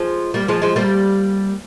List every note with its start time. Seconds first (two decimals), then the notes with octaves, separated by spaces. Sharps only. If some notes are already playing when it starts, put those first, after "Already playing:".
Already playing: F3 G#3
0.34 G3 A#3
0.48 F3 G#3
0.62 F3 G#3
0.76 G3 A#3